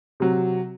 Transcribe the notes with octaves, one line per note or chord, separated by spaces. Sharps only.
C3 F#3